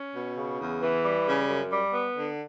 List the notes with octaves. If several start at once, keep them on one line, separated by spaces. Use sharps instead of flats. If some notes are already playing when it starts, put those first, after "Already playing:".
Already playing: C#4
B2
C#3
E2
E3
G3
C#3
F#2
G3
B3
D3